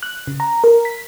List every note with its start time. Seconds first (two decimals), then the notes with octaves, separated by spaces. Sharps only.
0.03 F#6
0.27 C#3
0.40 A#5
0.64 A#4
0.85 B6